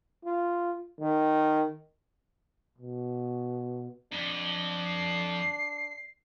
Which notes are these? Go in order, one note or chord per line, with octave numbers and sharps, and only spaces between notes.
F4
D#3
B2
F2 D4 G7
C7